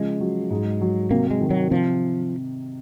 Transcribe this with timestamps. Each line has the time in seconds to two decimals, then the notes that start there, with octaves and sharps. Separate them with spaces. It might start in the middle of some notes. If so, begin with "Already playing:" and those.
Already playing: C#3 F3 G#3
0.20 F#3
0.51 G#2
0.81 F#3
1.11 C3 A#3
1.31 G#3
1.41 D#3
1.50 F#3
1.71 C3 F3